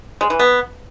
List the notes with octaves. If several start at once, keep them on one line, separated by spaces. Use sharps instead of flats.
G#3
E3
B3